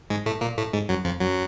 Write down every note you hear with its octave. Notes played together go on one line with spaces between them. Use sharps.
G#2 G#3
A2 A3
A#2 A#3
A2 A3
G#2 G#3
F#2 F#3
F2 F3
F#2 F#3